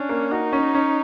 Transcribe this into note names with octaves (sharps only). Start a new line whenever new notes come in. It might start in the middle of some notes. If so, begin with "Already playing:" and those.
Already playing: C#4 D4
A#3
D#4 F#4
C#4
C#4